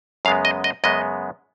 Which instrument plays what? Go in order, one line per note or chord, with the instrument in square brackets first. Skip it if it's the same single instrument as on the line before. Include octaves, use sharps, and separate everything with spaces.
[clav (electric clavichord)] F#2 C#3 G#3 B3 F5
D#5
D#5
F#2 C#3 G#3 B3 D#5